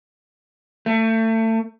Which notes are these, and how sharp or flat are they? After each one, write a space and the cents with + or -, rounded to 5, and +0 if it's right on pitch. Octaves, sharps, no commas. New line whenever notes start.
A3 +30